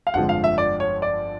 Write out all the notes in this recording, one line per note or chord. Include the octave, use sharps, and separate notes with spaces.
F5
G1 F2 D3 F3 G#3 F#5
F5
E5
D5
C#5
D5